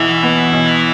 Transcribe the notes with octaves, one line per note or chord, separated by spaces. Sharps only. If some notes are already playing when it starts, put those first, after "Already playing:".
Already playing: B1 B2 E3 E4
B3
B1